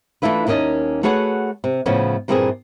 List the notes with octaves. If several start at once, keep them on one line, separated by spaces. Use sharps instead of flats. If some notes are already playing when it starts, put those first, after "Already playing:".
E3 A3 D4 E4 F4 B4
D#2 A#3 B3 C#4 D#5 A5
A3 F#4 G#4 B4 C#5 F#5
C3
A2 C#3 F3 B3 C#4
G2 A#2 E3 C4 G4 G#4